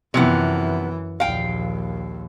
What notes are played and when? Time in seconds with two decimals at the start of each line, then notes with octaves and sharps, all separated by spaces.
0.14 F#2 C3 E3 F3 B3
1.20 A#1 D#2 F5 G5